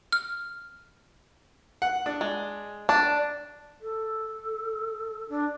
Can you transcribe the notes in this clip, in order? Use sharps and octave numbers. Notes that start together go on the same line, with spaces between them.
F6
F#5
D4
G#3
D4 A5
A4
D4